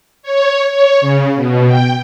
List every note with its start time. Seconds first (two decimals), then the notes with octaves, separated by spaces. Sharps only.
0.23 C#5
0.72 C#5
1.01 C#3
1.35 B2
1.67 G5